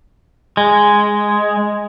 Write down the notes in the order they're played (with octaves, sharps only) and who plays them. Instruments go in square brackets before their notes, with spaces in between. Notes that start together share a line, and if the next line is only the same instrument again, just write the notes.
[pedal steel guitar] G#3